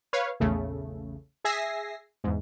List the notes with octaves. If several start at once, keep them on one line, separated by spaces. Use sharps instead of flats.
B4 C#5 F5
A#1 E2 C#3 A3
G#4 E5 G#5 A#6 C7
E2 G#2